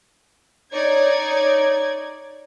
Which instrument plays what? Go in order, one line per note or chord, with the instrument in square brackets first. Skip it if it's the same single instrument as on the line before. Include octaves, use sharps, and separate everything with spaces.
[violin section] D#4 C#5 D5 G#6